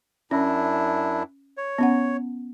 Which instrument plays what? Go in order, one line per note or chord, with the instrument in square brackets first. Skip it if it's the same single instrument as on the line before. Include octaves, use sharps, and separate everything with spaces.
[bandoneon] F#2 D4 E4 [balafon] C#4
[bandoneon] C#5
[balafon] B3 C#4 F#5